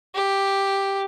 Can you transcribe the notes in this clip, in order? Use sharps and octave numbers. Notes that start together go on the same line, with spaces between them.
G4